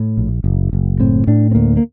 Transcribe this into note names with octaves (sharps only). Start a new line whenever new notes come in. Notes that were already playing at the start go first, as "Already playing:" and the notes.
Already playing: A2
A#1
F#1
F#1
A2 C4
A2 D4
C4
D2 A#3
A#3